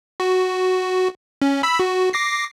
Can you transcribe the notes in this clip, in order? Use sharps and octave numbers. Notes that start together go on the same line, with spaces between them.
F#4
C#4
B5 E6 B6
F#4
D6 A#6 C7